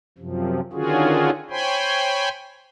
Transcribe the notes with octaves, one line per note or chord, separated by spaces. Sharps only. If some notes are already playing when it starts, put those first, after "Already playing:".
F#2 C3 F3
D3 D#3 C#4 F4 F#4 G#4
C5 C#5 G5 G#5 B5 C6